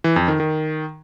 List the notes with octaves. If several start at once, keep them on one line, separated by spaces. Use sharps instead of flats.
E3
F2
D#3
D#3